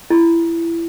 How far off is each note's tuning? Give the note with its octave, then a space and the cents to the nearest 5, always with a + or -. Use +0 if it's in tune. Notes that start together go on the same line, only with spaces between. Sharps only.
E4 +20